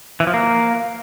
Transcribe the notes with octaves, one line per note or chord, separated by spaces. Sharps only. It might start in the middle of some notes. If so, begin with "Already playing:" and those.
E3
F3
A#3